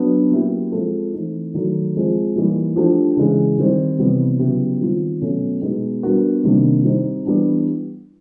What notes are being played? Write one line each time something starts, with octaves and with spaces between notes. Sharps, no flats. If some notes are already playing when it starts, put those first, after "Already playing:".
Already playing: F#3 B3 D4
F#3 A#3 C#4 E4 G4
F3 G#3 C4 F4 A4
E3 A3 C4 D#4
D#3 F#3 A3
F3 G#3 C4
E3 G3 A#3 D#4
F3 A3 D4 G4
C#3 E3 G#3
D#3 G3 C4 D#4
C3 E3 G3 B3
C#3 F#3 B3 E4 G4
D#3 G3 C4 F4
B2 F#3 A3 C#4
B2 G#3 B3 D#4
G3 B3 D4 F#4 A#4
C3 D#3 G3 A#3 D4
G3 C4 D#4
E3 G3 B3 D4